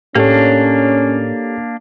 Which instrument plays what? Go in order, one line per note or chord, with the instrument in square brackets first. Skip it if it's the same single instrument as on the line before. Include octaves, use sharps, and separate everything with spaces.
[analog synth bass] A2 [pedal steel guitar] A#3 D4 [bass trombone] C#4 [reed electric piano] G4 A4 C#5